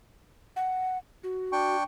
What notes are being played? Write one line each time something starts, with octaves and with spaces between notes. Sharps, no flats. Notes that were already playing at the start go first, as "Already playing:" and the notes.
F#5
F#4
D4 G5 C#6